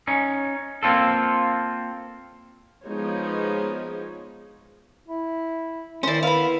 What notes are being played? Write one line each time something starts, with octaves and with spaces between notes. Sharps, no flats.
C#4 D#4
A#3 C4 F4 A4
F3 G#3 B3 D#4 C5 C#5
E4
D#3 C#4 E4 C5 D5
B3 E4 F5 B5